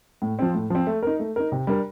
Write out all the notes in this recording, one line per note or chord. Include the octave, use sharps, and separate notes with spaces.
A2
F3 C4
A2
F3 C4
A3
D#4 A#4
A3
D#4 A#4
C3
G3 D4 G4 A#4